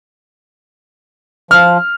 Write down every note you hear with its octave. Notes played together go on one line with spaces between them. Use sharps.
F3 F6